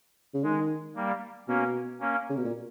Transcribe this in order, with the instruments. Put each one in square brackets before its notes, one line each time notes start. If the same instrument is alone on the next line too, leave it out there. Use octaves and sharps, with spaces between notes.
[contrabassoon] C#3
[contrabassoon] D#3 [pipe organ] G#3
[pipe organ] G3 A#3
[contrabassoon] B2 [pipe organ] A#3 C#4
[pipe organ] A#3 C#4
[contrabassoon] C#3
B2
A#2